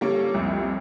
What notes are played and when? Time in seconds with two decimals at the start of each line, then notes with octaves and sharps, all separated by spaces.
0.01 G3 A#3 C#4 A4
0.34 C2 F2